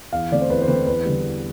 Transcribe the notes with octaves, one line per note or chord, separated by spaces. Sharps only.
E2 F5
D3 A3 C4 D5
C5
E2 B4
C5
D3 A3 C4 B4
E2 B4
D3 G3
E2